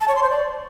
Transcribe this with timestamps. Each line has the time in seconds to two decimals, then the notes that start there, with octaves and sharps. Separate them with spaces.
0.01 A5
0.08 C#5
0.15 C6
0.23 C5
0.30 D5